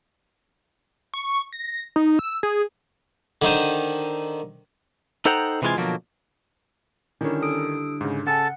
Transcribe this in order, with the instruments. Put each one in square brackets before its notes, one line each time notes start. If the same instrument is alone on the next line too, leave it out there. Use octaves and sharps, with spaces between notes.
[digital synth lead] C#6
A#6
D#4
E6
G#4
[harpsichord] D3 D#3 C5
[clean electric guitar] D#4 A4 C5 F#5 G5 A#5
C3 E3 G#3 A#3 F4 G#5
B2 D3 F3 F#3 A#3
[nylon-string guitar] D3 G3 E4 [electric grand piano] D#3 C#5 [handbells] C#4 A#4
[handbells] A4 D#6 D7
[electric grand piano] G#2 C#3
[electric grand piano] C#3 G#5 [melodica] A4 A5 [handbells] F#5